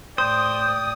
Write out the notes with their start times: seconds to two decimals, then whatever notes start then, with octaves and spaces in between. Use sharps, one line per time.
0.18 A2 C5 D5 G5 D#6